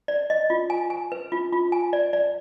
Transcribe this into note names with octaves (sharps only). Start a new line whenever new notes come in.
D5
D#5
F4
G#5
G#5
B4
F4
F4
G#5
D5
D5